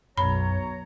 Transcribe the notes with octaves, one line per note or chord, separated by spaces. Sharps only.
B1 F#2 C#5 A#5 B5